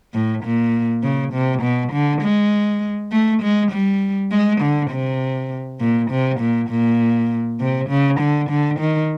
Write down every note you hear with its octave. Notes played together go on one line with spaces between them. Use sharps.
A2
A#2
C#3
C3
B2
D3
G#3
A3
G#3
G3
G#3
D3
C3
A#2
C3
A#2
A#2
C3
C#3
D3
D3
D#3